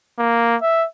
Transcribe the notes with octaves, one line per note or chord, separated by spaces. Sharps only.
A#3
E5